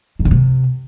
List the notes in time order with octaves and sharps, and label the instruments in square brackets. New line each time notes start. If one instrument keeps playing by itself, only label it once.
[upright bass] G#2
C#3
C3